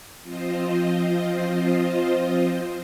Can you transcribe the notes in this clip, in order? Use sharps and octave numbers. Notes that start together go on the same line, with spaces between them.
F3 C4 F4 C5 D#5